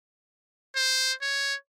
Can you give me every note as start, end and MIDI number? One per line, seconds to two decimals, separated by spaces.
0.76 1.13 72
1.22 1.55 73